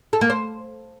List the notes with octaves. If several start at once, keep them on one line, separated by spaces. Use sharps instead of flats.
A4
A#3
C5